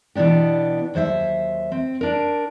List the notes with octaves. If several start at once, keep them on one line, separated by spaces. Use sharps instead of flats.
B2 E3 B3 D4 G4
D#2 F#3 C5 D5 E5
C4
D4 A#4